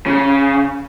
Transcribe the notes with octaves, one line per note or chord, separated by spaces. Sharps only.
C#3